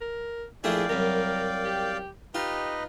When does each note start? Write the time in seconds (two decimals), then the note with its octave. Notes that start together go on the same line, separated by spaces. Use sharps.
0.01 A#4
0.64 A#1 A3 E4 G#4 D5 F5 G5
0.89 C2 F#2 A#4
1.65 G4
2.35 D#4 F4 G4 B4 D#5